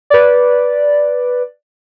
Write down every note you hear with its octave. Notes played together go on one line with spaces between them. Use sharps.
B4 D5